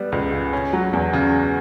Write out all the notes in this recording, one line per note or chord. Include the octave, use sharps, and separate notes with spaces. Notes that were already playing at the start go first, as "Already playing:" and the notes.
Already playing: G3 B3
C#2
C#3
C#4
F#3
E2
C#3